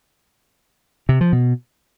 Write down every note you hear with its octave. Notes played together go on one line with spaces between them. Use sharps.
C3
F3
B2